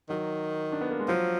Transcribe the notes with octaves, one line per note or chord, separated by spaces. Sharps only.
D#3 F#3
D4
B3
A#3
G#3
F3 F#3